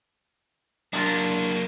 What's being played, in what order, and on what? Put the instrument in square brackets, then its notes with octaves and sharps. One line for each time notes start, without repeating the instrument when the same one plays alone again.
[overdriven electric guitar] F#3 A#3 [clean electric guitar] D4 F4